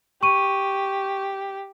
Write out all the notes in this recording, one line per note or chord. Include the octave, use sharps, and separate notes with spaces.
G4 C#6 D#7